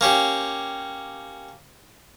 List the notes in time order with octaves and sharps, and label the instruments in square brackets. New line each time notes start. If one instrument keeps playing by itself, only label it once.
[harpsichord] A#3 C#4 G4